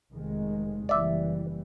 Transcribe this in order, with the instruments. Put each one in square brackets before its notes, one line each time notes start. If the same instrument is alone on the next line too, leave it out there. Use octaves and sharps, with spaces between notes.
[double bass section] F1 D#3 G#3
[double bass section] F#1 E3 G3 [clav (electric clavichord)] D5 E5